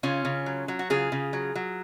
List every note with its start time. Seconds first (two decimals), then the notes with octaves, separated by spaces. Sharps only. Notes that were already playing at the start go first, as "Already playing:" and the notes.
0.03 C#3 C#4 F4
0.25 C#3
0.46 F#3
0.68 F#3
0.79 F#4
0.90 C#3 F4 G#4
1.12 C#3
1.33 F#3
1.56 F#3